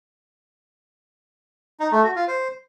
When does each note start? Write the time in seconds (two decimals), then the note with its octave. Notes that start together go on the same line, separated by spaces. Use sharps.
1.80 D#4
1.92 A3
2.04 F#4
2.16 F4
2.28 C5